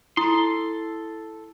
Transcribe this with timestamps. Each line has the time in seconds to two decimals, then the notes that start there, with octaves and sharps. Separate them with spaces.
0.17 E4 A4 C6 D#6